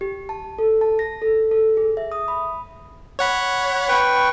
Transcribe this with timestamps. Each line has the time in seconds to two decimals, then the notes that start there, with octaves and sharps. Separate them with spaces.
0.01 G4
0.29 A5
0.59 A4
0.81 A5
0.99 A#6
1.22 A4
1.51 A4
1.77 G#4
1.97 E5
2.12 D#6
2.28 B5
3.19 C#5 F#5 B5
3.89 B4 G5 C#6